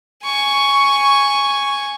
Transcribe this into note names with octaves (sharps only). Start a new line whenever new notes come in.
G#5 C#6